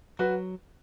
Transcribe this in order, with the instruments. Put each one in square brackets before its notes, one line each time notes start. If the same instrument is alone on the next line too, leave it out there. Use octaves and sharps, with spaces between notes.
[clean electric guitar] F#3 [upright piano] F#4 B4